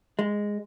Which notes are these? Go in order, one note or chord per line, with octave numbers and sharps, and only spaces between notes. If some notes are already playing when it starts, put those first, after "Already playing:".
G#3